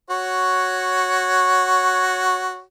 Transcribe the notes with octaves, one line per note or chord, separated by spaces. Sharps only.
F#4 C#5